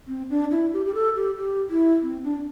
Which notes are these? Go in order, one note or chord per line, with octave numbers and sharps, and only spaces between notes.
C4
D4
E4
G4
G4
A4
G4
G4
E4
C4
D4